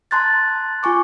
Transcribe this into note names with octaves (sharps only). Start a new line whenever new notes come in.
A5 A#5 C6 F#6 G#6 A6
F4 G#5 C#6 D6